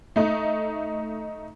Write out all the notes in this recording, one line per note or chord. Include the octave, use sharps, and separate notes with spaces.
A3 D#4